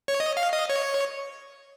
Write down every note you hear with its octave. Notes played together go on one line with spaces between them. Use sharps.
C#5
D#5
F5
D#5
C#5